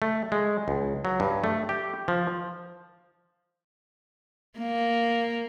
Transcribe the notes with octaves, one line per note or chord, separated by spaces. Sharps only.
A3
G#3
C#2
F#3
G2
A3
G4
F3
A#3